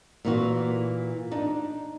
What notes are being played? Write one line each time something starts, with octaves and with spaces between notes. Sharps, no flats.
A#2 E3 F#4
D4 D#4